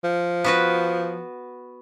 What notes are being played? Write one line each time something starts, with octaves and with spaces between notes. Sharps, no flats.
F3
B3 F#4 B4